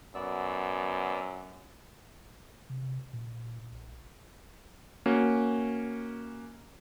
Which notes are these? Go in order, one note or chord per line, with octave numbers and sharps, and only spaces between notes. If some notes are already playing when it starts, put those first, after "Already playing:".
F#2 B3 D5 E6
C3
A#2
A#1
E1
A#3 C#4 F#4